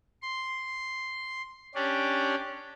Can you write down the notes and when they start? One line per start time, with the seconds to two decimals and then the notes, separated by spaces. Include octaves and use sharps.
0.22 C6
1.75 C#4 D4 G4 D5